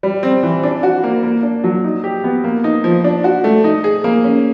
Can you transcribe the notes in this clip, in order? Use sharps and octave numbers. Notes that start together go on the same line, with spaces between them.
G3
C4
E3
D4
F#4
A#3
A#3
D4
F#3
D#4
G4
B3
A#3
D#4
F3
D4
F#4
A3
D#4
G#4
A#3
C#4